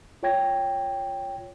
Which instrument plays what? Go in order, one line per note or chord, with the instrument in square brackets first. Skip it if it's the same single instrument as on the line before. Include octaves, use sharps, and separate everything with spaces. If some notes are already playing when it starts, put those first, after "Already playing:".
[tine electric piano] F4 C#5 G5 G#6 A#6